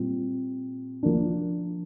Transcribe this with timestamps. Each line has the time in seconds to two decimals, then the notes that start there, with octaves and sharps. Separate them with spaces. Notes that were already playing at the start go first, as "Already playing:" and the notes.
Already playing: A#2 G3 C4 F4
1.03 F3 A#3 D4